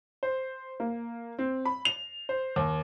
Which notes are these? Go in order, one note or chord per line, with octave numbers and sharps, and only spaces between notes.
C5
A#3
C4
B5
F7
C5
D#2